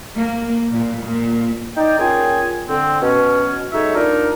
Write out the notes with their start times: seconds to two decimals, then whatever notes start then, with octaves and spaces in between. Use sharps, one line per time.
0.17 A#3
0.72 A#2
1.04 A#2
1.76 D#4 D5 G5
1.99 A#2 C#3 F4 G5 G#5 D#6
2.68 D3 C4
3.01 B2 C#4
3.72 F#3 G#3 D#4 A4 C#5 E5
3.95 A#3 D4 D#4 F4 A#4